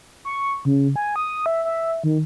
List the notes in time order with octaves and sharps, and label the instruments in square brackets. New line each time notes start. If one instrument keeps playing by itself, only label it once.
[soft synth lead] C#6
C#3
G#5
D#6
E5
E5
D#3